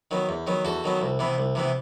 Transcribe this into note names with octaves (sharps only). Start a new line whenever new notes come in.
D#3 F#3 B3
E2
D#3 F#3 B3
E2 F#4 A4
D#3 F#3 B3
C2
C3 E3 B3
C2
C3 E3 B3